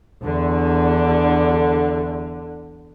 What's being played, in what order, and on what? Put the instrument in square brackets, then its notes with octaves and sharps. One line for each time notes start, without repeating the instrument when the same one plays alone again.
[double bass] E2 [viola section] D3